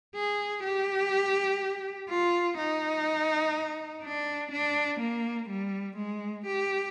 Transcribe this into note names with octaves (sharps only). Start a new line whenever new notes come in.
G#4
G4
F4
D#4
D4
D4
A#3
G3
G#3
G4